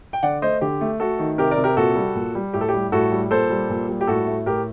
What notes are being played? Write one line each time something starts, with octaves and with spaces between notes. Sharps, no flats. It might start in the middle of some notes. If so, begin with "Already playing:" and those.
G5
D3 D5 F#5
A3 C5 D#5
D3 G4
A3
A3 F#4 A4
D#3
C3 G4 A#4
A#4 D5
C3
G4 A#4
A#2 F#4 A4
G3
A#2
G3
A2 G4
A4
G4
G3
A2 F#4 A4
G3
A#2 A4 C5
G3
A#2
G3
G4
A2 F#4 A4
A3
A2 G4 A#4